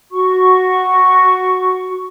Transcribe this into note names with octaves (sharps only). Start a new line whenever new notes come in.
F#4 C#6